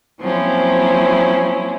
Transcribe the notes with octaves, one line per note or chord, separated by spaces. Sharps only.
F3 F#3 A#3 C4 C#4 E4